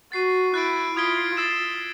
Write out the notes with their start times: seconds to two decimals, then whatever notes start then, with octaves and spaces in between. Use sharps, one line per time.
0.12 F#4 A6 C7 D#7
0.54 E4 F#6 A6 D7
0.96 F4 D#6 G#6 B6 D7 G7
1.37 E6 A6 C7 E7